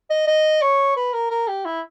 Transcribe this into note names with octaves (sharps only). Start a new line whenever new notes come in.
D#5
D#5
C#5
B4
A#4
A#4
G4
E4